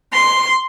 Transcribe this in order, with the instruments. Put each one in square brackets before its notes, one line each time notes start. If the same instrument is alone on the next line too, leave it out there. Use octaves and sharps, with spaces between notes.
[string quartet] C6